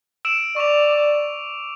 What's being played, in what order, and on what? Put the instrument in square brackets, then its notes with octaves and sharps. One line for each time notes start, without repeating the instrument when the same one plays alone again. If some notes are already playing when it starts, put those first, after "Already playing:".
[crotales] E6 D7 E7
[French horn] D5 [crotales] C#6 D6 F7